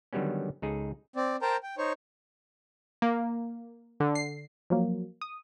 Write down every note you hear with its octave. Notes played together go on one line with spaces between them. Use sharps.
D3 D#3 F#3 G3 B3 C#4
C#2 D#4 G#4 A4
C4 D5
A#4 C5 G5 A5 A#5
G5
D#4 C5 C#5
A#3
D3
C7
F3 F#3 A#3
D#6